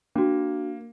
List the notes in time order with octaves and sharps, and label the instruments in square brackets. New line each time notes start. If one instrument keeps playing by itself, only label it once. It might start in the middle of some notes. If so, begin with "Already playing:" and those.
[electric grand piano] A#3 [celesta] D4 F#4